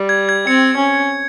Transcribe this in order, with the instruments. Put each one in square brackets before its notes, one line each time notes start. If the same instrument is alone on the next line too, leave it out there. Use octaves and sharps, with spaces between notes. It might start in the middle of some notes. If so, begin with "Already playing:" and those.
Already playing: [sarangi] G3
[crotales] G#6
G#6
[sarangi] C4 [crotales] C#7
[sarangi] C#4